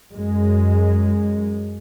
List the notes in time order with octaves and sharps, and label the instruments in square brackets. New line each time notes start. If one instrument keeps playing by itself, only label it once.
[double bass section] F#2 G#3